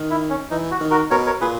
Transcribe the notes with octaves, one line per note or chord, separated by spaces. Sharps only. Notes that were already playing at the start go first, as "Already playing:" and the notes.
Already playing: D#3
E4
C#4
E3 D#4
F#4
D#3
F#4 A#4
B2 A#4 C#5
A#4 C#5
A#2 G#4 B4